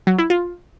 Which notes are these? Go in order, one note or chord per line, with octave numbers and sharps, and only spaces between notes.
F#3
E4
F4